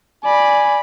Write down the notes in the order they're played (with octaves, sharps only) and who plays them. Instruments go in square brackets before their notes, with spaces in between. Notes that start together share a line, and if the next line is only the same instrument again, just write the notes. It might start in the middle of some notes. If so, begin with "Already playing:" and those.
[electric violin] D5 B5 [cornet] G#5